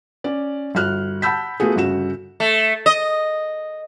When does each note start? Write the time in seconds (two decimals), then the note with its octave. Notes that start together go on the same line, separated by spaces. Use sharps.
0.24 C#4 D5
0.75 G1 F#4 F6 F#6
1.22 F#5 A5 B5 E6 G6 B6
1.60 A3 B3 F4 F#4 G#4
1.76 G1 C#3 F#4 E7
2.40 A3
2.86 D#5